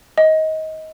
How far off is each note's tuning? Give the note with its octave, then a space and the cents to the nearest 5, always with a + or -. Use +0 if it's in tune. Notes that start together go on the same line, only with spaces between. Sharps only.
D#5 +20